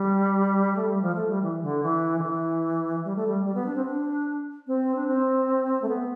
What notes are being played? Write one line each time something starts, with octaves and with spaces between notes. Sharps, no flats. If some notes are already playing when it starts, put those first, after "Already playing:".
Already playing: G3
A3
G3
F3
A3
G3
E3
D3
E3
D3
E3
G3
A3
G3
G3
B3
D4
C4
D4
C4
D4
C4
A3
B3